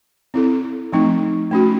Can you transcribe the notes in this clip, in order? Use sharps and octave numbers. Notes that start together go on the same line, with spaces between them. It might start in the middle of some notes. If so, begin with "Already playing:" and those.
C4 E4 A4
F3 A3 C4 D#4
A3 C#4 F#4